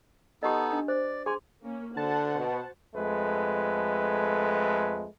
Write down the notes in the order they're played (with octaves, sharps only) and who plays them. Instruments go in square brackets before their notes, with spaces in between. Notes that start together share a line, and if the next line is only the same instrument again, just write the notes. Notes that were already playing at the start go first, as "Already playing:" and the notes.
[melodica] B3 D#4 A4 [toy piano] G4 D#5
[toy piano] D4
[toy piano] C5 [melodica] D5
[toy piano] G#4 C6 [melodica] G#5
[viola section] A#3 C#4
[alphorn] D3 [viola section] F#4 C5 F#5 [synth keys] A5
[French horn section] B2
[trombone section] F2 G#3 A3 B4